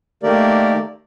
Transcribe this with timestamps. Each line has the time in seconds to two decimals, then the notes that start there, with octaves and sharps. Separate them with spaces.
0.23 D#3 A3 A#3 G4 A#4 D5